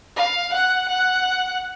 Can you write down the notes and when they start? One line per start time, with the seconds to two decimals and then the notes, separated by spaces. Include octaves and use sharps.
0.16 F5
0.53 F#5
0.89 F#5